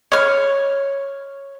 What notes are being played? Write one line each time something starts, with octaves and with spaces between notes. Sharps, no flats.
C#5 F6